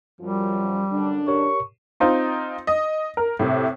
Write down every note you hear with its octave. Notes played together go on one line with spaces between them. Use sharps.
F#2 F3 G3
F#2 D3 D4
G4 A#4 C#5 C#6
C4 D#4 F4
D#5
A#4
A2 C3